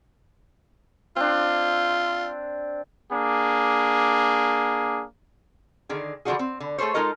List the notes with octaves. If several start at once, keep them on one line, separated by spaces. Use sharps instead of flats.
C4 D4 F4
A#3 D4 G#4
D3 D#3 G#4
D3 E3 F3 D4 F#4 G#4
C4
D3
A3 G#4 A4 C5 C#5
G#3 D#4 F4 A4 A#4 D#5